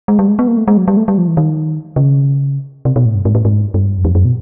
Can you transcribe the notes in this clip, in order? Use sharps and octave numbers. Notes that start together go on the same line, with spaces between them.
G#3
G3
G#3
B3
A#3
A3
G#3
F#3
G3
A3
G3
F3
E3
D#3
C#3
C3
B2
A2
G2
G#2
A2
G#2
G2
F#2
F2
F#2
B2